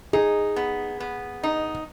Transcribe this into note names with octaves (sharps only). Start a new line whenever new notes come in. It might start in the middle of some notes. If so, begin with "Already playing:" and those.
D#4 G#4
B3
B3
D#4